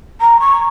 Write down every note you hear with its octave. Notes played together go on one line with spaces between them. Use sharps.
A#5
C#6